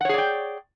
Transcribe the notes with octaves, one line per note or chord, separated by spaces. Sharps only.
G#4 C#5 D5 F#5 G5